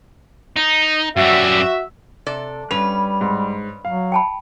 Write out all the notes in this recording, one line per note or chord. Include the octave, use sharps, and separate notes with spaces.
D#4
F#2 G3 F#4 E5
C3 A4 D5
G2 G3 C#4 B4 F7
G#2
F#3 F5
G5 A5 B5